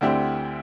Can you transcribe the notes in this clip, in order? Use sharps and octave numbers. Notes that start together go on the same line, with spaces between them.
D2 D3 C4 E4 G4